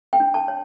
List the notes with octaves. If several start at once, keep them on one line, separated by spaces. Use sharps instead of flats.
G5
D4
A5
C#5